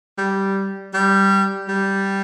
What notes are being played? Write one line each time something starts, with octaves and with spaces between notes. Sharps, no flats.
G3
G3
G3